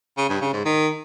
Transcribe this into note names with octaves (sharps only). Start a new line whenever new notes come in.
C#3
G2
C#3
G#2
D#3